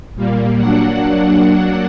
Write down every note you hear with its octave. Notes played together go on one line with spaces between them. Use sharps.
A#2 G3 A#3
F#3 A#3 D4 F#5